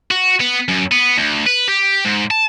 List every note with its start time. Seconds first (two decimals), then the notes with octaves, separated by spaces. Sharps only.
0.11 F#4
0.40 B3
0.68 F#2
0.92 B3
1.18 D2
1.47 B4
1.68 G4
2.05 G#2
2.31 A5